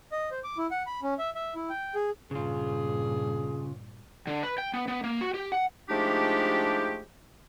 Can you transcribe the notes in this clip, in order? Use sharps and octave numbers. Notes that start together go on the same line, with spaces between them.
D#5
C5
D6
E4
F#5
B5
C#4
E5
E5
E4
G5
G#4
G2 A#2 C#3 F4 G#4
D3
B4
G5
B3
B3
A#3
F#4
G4
F#5
F3 G#3 A3 D4 D#4 G4